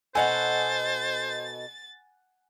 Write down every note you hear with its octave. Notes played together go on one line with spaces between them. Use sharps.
B2 D#4 A4 C5 F#5 G#5 A6